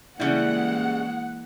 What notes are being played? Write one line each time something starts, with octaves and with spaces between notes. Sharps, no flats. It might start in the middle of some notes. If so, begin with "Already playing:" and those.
C#3 E3 G3 G#3 A#3 E4 F#5